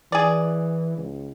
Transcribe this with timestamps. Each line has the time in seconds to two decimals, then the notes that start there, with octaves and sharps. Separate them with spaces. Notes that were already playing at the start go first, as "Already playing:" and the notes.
0.12 E3 G#4 D5
0.97 C#2